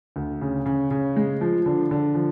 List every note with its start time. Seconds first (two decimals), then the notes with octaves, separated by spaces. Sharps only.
0.16 D2
0.41 C#3
0.66 C#3
0.91 C#3
1.16 G#3
1.41 F3
1.66 D3
1.91 D3
2.15 F3